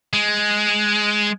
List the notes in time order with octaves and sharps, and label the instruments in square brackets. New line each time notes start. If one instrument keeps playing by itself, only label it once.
[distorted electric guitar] G#3